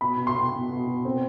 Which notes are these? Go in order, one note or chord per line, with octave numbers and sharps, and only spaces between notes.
B2 B5
B2
C6
B2
B2
B2
B2
C4